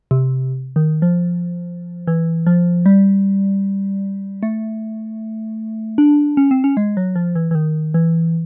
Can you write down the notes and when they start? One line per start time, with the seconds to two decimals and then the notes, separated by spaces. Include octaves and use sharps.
0.11 C3
0.76 D#3
1.02 F3
2.07 E3
2.46 F3
2.86 G3
4.43 A3
5.98 D4
6.37 C#4
6.51 C4
6.64 C#4
6.77 G#3
6.97 F#3
7.16 F3
7.35 E3
7.51 E3
7.55 D#3
7.94 E3